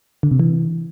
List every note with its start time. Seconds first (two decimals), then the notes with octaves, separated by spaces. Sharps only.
0.23 D3
0.31 C3
0.40 E3